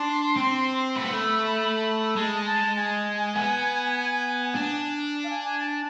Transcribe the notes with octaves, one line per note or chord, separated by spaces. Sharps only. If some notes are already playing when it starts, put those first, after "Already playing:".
Already playing: D4 C6
C4
A3 B5
B3
A3
G#3 A5
A5
G#5
B3
D4
F5
G#5
G#5
A5